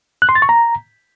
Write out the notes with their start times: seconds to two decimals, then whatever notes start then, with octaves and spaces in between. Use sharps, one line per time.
0.22 F#6
0.29 C6
0.35 A6
0.42 C#6
0.49 A#5